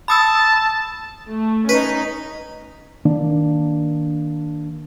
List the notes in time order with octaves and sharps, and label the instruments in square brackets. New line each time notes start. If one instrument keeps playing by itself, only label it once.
[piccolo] A5 [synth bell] B5 D#6 E6
[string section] A3
[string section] C#4 D#4 [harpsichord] B4
[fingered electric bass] D#3 A#3 D4